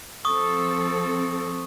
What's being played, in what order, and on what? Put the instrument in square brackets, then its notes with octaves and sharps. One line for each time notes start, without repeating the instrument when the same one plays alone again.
[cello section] F3 C4 A4 [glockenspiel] C#6 D#6